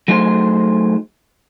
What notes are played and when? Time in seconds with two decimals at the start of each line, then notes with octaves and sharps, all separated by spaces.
0.08 F#3 A3 D#4 G#4 C5